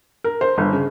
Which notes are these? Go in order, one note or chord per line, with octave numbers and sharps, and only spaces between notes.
A#4
C5
G1
C#3